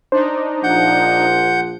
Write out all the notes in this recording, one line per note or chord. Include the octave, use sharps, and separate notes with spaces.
D4 D#4 C5
A#1 F3 F#5 G6